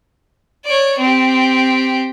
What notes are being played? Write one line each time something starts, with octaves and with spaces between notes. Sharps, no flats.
C#5 D5
C4 G4